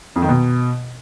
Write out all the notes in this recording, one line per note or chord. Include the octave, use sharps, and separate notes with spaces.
F2
D#3
B2